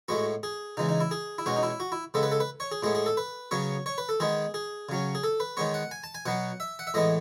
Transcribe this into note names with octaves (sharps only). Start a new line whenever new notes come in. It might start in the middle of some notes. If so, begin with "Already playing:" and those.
A2 G#3 B3 F#4
G#4
C#3 E3 G#3 D#4
D#4
E4
G#4
E4
B2 G#3 C#4 F#4
D#4
E4
F#4
E4
C#3 G#3 B3 A4
B4
A4
B4
C#5
G#4
A2 G#3 B3 G#4
G#4
A4
B4
C#3 F#3 B3 C#5
C#5
B4
A4
D#3 G#3 B3 G#4
G#4
C#3 F#3 C#4
G#4
A4
B4
D#3 G#3 B3 C#5
F#5
G#5
A5
G#5
B2 F#3 B3 F#5
E5
F#5
E5
A2 E3 G#3 B3 D#5